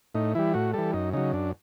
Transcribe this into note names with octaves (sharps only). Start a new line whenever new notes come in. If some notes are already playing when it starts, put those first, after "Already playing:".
A2 D#4
E3 G3 E4
A2 F#4
E3 G3 A4
F#2 D#4
C#3 F#3 D#4
F#2 D4